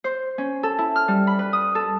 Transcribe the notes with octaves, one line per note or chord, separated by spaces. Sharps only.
C5
C#4
A4
E4
F6
G3
B5
B4
D#6
A4